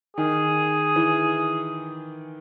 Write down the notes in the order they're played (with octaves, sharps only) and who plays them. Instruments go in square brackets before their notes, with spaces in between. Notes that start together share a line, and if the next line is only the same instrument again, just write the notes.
[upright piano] D#3 [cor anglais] G#4
[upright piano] E3